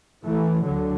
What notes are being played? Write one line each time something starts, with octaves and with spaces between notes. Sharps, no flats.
E3 A3
D2 D3 F#3